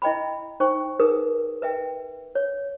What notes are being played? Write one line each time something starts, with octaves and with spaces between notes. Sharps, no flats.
E4 D#5 G5 B5
D#4 C5 G5 C#6
D#4 G#4 A#4 B4 D#6
B4 E5 G5
C#5